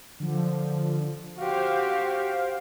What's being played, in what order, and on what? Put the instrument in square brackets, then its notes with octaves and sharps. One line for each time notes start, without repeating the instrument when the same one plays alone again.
[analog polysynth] D3 F3
[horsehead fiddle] F#4 G4 [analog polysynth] C5 F5